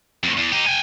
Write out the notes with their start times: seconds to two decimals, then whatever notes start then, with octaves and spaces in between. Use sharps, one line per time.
0.24 F2 A2
0.37 E2
0.52 D#4 G4
0.66 G5 G#5